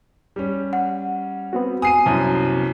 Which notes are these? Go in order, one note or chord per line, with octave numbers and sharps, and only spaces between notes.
G3 C#4
F#5
B3 C4 F#4
G#5 D#6 C7 D#7
C2 F#2 A5